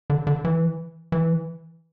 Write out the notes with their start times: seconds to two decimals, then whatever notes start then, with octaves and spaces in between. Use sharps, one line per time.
0.10 D3
0.27 D3
0.45 E3
1.12 E3